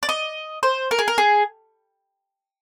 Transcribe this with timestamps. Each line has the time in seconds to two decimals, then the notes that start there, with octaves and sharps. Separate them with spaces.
0.03 D5
0.09 D#5
0.63 C5
0.91 A#4
0.99 G#4
1.08 A#4
1.18 G#4